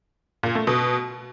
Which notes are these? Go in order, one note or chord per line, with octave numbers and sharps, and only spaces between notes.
A#2
A3
B2